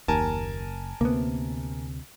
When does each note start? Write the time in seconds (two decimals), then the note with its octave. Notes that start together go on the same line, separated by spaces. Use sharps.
0.08 F#1 D#2 A#4 G#5 A5
1.01 D2 C3 A#3 B3